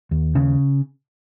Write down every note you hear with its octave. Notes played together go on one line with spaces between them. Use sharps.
D#2
C#3